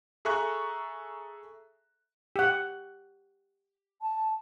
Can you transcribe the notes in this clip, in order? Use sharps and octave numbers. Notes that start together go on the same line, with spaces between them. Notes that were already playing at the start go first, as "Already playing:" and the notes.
G#4 A4 E5 A#5 C#6 F#6
G4 F#5
A5